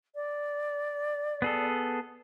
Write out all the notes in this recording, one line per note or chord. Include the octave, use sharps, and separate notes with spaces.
D5
B3 G#4 A4